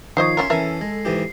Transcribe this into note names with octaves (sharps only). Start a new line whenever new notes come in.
D#3 F3 D#4 C5 C#5 D#5 C7
C#4 F4 A#4 C#5 E5 C6
E3 C#4 A4 A#4 E5
G#3
G#2 E3 G4